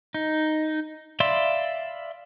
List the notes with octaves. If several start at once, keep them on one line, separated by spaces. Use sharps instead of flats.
D#4
D5 E5 F5 B5 C6